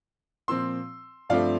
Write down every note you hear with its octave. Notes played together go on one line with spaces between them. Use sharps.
A#2 F3 C4 C6 E6
G2 F3 A3 C4 D5 F5